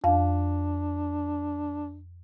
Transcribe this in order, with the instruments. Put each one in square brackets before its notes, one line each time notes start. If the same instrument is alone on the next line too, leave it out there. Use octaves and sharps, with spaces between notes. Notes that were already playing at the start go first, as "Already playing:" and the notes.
[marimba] F2 F5 [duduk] D4